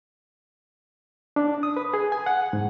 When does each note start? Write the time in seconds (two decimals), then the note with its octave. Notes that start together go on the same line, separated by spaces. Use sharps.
1.36 D4
1.63 D#6
1.77 B4
1.94 G#4
2.12 G#5
2.26 F#5
2.53 G#2